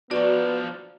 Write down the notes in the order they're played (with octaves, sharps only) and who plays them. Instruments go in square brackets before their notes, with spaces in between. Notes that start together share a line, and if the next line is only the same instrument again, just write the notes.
[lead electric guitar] F3 D4 [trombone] B3 [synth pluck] F#4 A#5 [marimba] D5 C#6